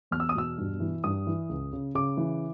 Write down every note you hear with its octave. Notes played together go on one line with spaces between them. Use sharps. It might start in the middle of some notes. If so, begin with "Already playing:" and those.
E2 F6
E6
D#6
B2 E6
G2
E3
G2 D#6
E3
C#2
C#3
C#3 D6
E3